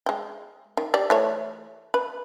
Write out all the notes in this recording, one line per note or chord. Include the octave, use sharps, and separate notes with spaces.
G#3 G5
D#3
G4 D5
E3 A3 C#5
B4